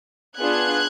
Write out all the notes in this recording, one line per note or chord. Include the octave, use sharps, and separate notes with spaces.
B3 D4 F4 G#4 F#6 G#6